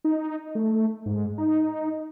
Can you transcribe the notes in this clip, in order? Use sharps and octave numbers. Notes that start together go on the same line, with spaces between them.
D#4
A3
G#2
D#4